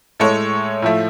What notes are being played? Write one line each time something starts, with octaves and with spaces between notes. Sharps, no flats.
A2 G#3 A4 C#5
A2 F3 A3